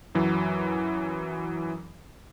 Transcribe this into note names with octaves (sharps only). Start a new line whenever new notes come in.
F#2 E3 F#3